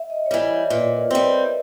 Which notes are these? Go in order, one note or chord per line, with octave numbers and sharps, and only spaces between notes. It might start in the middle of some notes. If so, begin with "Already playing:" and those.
Already playing: E5
D#5
C#5
E3 G3 D5
C#5
A#2 B4
A#4
G3 C4
B4